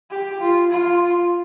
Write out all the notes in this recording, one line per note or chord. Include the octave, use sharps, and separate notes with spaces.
G4
F4
F4